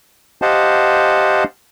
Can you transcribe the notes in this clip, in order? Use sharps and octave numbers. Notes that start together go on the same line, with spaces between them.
G4 C5 D#5 F5 F#5 A5